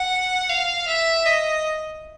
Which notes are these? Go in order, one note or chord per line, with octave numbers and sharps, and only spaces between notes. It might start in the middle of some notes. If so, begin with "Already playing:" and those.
Already playing: F#5
F5
E5
D#5